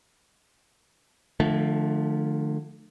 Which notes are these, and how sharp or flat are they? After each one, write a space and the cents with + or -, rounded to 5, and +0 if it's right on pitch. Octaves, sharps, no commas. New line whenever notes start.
D3 +35 F3 +5 A3 -15